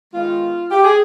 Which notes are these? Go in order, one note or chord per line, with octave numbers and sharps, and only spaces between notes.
D#3 G#3 B3 F4
G4
G#4